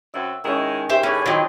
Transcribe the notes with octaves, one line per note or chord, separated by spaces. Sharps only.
F#2 C4 F#4 E5
D#3 G#3 C#4 D#4 E4
G4 C5 E5
A2 A3 C#4 G#4 B4 C#5 D6
D#3 F3 F#3 E4 G4 D#5 C6